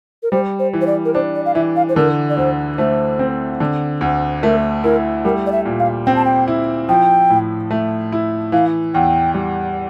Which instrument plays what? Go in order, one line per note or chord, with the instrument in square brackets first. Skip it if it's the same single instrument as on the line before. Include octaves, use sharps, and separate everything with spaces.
[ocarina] A#4
[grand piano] G3 [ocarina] C5
[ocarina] C5
[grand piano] E3
[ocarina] C5
D5
A#4
[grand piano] D4 [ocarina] C5
[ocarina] D5
F5
[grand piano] E3 [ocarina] E5
[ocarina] F5
C5
[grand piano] D3 [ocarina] A#4
[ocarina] D5
[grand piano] D2 [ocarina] C5
[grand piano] A3 [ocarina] C5
[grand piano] C4
D3
D2
[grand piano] A3 [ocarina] A#4
[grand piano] E4 [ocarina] A#4
[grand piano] G3 [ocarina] A#4
[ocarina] D5
E5
[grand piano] A#2
[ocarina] F5
[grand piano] C4 [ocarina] G5
[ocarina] A5
G5
[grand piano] E4
[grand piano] F3 [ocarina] G5
[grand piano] A2
A3
E4
[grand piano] E3 [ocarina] F5
[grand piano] E2 [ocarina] G5
[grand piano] G3